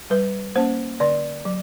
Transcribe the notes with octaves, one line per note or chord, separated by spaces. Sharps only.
G3 B4
A#3 C#4 C5
D3 D5
F#3